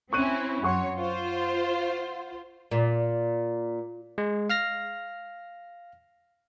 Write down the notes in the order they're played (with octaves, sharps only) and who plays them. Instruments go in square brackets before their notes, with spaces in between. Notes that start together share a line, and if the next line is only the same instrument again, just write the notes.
[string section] C4 C#4 E4 [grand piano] C#6 F#6 D#7
[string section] F#2 C#5 [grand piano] F#5 C6 C#6
[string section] F4 C5
[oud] A#2
[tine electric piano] G#3
F5 F6 A#6